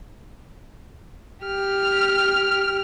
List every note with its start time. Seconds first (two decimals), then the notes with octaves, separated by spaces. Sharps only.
1.45 G4 F6